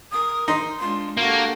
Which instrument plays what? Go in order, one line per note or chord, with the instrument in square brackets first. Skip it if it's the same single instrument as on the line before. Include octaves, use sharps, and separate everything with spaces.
[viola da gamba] A#4 [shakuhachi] D#6
[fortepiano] D#4 [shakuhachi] C6
[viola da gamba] G#3 D4 F4 [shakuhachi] C6
[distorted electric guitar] A#3 [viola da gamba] D4 G4 A4 [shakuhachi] F#4